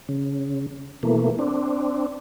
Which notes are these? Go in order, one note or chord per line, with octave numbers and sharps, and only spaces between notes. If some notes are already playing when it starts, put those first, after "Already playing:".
C#3
B2 E3 A3 A#3
C4 D4